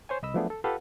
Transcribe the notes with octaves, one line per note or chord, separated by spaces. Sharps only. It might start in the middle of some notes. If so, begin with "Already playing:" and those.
C5 C#5 G#5
C2 D#5 B5 E6
F3 F#3 A3 B3 D4 G#4
A4
F4 G4 A4 B4 F5 F#5